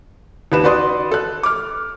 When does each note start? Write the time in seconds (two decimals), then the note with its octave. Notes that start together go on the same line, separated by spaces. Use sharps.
0.52 D#2 B4 E7
0.64 F#4 B4 D5 C6 D#6
1.11 A4 F#6
1.43 D6 F6